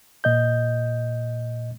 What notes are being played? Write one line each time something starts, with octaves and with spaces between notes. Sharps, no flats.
A#2 D#5 G6